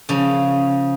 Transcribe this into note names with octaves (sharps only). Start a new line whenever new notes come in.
C#3 F3